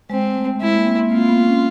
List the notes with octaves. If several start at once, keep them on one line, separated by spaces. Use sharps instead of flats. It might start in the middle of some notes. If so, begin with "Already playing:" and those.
G#3 C4
A3
G#3 E4
A#3
C4
C4
A#3 F4
B3
C#4